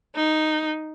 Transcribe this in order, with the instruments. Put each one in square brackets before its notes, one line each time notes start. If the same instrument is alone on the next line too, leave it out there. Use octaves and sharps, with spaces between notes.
[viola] D#4